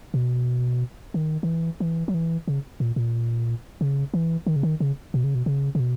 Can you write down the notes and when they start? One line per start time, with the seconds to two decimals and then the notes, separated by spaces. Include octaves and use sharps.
0.14 B2
1.14 D#3
1.43 D#3
1.47 E3
1.80 E3
2.08 F#3
2.14 E3
2.48 C#3
2.80 A#2
2.96 A#2
3.81 C#3
4.14 E3
4.47 D#3
4.56 C#3
4.63 D#3
4.80 C#3
5.14 B2
5.24 C#3
5.35 B2
5.46 C#3
5.75 C#3
5.80 B2